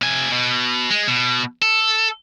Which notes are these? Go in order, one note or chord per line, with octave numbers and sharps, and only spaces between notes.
C3 G#5
B2
G#3
B2
A4